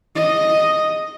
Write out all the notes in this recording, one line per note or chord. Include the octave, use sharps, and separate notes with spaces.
D#5